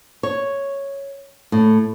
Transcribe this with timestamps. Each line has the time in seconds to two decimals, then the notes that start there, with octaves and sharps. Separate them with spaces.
0.23 C#5
1.52 A2